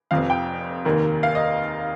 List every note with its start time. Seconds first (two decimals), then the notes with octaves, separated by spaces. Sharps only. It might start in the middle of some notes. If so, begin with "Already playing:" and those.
0.11 F1 F2 F3 C4 F5
0.30 G5
0.85 F1 D#2 D#3 A#3
1.23 F5
1.35 D#5